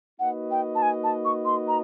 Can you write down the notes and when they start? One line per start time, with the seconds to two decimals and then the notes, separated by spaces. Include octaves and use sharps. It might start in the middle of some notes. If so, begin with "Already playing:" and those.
0.19 A#3 D#4 F#4 B4 D#5 F#5
0.51 G5
0.75 A5
0.82 G#5
1.04 A5
1.25 C#6
1.45 C6
1.68 A#5